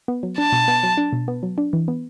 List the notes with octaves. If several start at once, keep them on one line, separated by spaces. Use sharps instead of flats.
B3
F#3
D4 A5
B2
B3
F#3
D4
B2
B3
F#3
D4
E3
B3